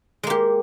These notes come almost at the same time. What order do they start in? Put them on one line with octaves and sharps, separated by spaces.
G#3 A#3 G4